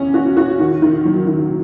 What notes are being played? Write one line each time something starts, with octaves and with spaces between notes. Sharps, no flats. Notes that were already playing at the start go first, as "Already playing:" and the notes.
Already playing: E2 C#4
F#4
F#4
D#3
D#3
F#3
D#3